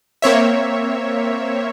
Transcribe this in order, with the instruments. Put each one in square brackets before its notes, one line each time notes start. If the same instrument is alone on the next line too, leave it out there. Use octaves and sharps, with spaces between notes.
[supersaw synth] A#3 C4 C#5 E5